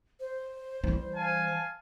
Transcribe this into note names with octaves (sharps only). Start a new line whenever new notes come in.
C5
E3 G3
F5 G#5 A5